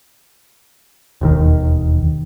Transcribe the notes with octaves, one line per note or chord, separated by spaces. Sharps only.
E1 D#2 D#3